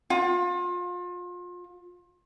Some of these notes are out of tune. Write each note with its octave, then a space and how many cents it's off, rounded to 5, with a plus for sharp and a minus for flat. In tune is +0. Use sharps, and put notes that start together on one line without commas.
F4 +30